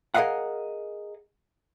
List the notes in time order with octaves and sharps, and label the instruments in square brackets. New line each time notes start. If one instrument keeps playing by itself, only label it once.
[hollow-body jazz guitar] G#4 A#4 B4 D#5 F5 F#5